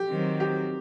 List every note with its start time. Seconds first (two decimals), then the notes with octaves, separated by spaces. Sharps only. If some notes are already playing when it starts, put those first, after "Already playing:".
Already playing: G4
0.10 D#3 F#3 C4
0.40 G4